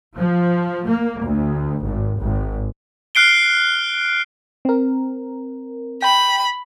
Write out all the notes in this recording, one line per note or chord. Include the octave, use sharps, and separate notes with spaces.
F3
A#3
D2
G#1
G#1
F6 F#6 C7 D7 G7
C4 A#4
G5 B5